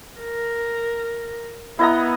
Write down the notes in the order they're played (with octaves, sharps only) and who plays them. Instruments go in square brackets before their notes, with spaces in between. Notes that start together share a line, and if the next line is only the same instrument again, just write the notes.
[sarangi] A#4
[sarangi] B3 [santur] E4 D#5 A#5